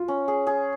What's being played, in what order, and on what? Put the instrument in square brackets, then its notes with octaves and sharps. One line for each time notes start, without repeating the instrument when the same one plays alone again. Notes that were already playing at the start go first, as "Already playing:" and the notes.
Already playing: [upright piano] F4
[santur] C#4
G#4
G#4